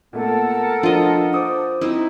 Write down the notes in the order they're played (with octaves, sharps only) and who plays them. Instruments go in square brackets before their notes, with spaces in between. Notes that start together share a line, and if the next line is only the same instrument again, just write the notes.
[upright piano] A#2 A3 [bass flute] B3 [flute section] A4 A#4 F#5
[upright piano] F3 [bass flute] D4 [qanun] F4 D#5
[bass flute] C5 [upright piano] D6 D#6
[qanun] C4 D#4 E4